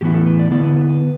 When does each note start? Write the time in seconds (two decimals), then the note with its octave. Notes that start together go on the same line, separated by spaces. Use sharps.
0.01 A2 E3 B3 E4 G4
0.14 A4
0.27 B4
0.39 D5
0.51 D3 B3 E4 D5
0.63 B4
0.76 B4
0.89 B4